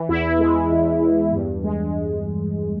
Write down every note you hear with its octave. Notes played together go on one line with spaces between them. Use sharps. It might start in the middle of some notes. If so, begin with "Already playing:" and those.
Already playing: E3
E2 E4
G#3
E2
E2
G2
G#3